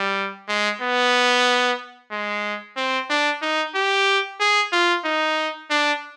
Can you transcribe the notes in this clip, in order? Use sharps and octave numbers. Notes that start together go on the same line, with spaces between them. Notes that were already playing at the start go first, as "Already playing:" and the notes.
Already playing: G3
G#3
B3
G#3
C4
D4
D#4
G4
G#4
F4
D#4
D4